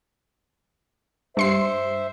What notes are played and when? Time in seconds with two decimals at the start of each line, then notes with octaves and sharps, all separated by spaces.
1.37 G2 C5 E5 C6 C7